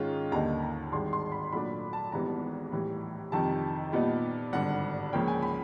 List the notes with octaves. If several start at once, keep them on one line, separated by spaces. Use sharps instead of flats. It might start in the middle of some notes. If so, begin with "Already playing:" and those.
Already playing: G#2 D#3 G#3 C#4 F4
D#2 D3 G3 A#3 D#4 A#5
A#5
G#1 G2 D#3 G#3 C6
C6
B5
A#2 F#3 A3 D4 B5
A5
G#1 G#2 E3 G3 B3 A#5
A2 E3 G3
F2 C3 D#3 G3 A5
A#2 G3 B3 D#4
G#1 G2 D3 F#5
C#2 C#3 F3 A#3 C#4 G5
G#5
B5